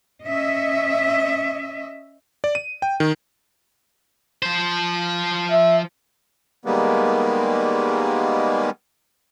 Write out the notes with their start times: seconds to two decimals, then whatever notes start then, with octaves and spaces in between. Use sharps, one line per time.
0.24 C#4 D#5 E5
2.44 D5
2.55 D#7
2.82 G5
3.00 D#3
4.42 F3 C5
5.52 E5
6.65 D#3 G3 G#3 A#3 B3